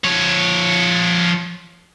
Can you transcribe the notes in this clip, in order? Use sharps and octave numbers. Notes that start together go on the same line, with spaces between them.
F3 C#5